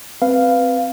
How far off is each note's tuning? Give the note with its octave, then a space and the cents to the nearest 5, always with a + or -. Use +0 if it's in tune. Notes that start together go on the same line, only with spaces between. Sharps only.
C4 +0 B4 +0 F5 +0